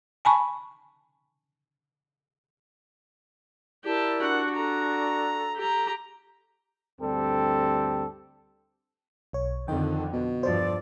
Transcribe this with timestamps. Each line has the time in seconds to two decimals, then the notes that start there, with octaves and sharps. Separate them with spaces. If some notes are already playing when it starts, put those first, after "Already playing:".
0.25 G#5 A5 B5 C#6
3.84 E4 G4 A#4 D5 A5
4.22 D4 F#4 F#5
4.55 A4 A#5
5.56 G4 A#5
7.00 D2 G2 G3 C4 G4 A4
9.33 B1 C#5
9.68 F2 D3 D#3 G5
10.13 B2
10.43 E2 G2 F3 F4 A4 C5 D5